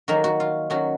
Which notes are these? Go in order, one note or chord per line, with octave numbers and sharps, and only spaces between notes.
D#3 F#3 A#3 F#4 A#4
F#4
F4
D#3 F#3 C#4 F#4